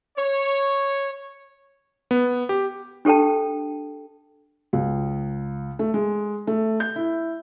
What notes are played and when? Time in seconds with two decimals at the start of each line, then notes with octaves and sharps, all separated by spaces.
0.17 C#5
2.11 B3
2.49 G4
3.05 D4 G4 A4 G5 A5
4.73 C#2
5.79 A3
5.94 G#3
6.47 A3
6.80 G6
6.96 E4